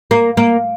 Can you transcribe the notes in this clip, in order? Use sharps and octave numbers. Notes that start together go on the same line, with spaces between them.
A#3
A#3